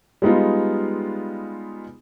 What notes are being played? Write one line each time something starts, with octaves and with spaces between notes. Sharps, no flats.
G3 G#3 B3 D#4 F4